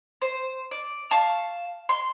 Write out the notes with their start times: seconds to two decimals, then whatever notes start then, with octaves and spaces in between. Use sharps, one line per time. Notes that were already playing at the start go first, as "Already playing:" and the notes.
0.22 C5
0.71 D5
1.11 F5 A5 C#6
1.89 C6